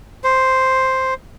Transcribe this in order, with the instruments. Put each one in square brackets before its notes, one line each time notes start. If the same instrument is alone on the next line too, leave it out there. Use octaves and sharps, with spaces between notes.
[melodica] C5